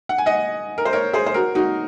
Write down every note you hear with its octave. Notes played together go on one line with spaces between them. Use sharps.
F#5
G#5
D#5 F#5
A#4
C5
A#4 C#5
G#4 C5
C5
F#4 A#4
D#4 F#4